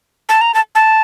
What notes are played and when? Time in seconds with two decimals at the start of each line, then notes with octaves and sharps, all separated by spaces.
0.29 A5
0.41 A#5
0.54 A5
0.75 A5